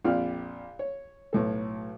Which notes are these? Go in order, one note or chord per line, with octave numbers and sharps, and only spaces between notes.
A#1 F2 F4 D5 G5 F6
C#5
B1 A2 A4